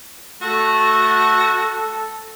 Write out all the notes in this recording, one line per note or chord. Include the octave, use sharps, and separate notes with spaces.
A3 F#4 A4